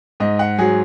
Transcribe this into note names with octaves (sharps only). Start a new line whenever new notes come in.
G#2 D#5
F#5
F#3 G#4